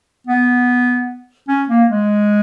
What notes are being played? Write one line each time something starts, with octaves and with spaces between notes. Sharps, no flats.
B3
C#4
A#3
G#3